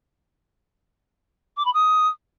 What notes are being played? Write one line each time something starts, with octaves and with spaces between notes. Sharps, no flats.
D6
B5
D#6